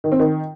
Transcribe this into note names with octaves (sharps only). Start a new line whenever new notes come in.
D#3
C4
D#3